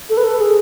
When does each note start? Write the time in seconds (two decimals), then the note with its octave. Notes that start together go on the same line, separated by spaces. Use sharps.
0.10 A4
0.17 B4
0.24 A4
0.41 G#4